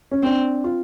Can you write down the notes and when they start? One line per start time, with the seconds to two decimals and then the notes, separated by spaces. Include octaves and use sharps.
0.11 C#4
0.23 C4 D4
0.64 F4